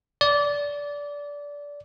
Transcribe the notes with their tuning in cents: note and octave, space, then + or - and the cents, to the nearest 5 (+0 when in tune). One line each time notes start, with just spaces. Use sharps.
D5 -20